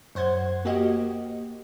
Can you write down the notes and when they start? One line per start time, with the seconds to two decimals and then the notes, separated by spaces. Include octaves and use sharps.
0.15 F#2 C5 F#5 G#6
0.65 A#3 F#4 G4 D#5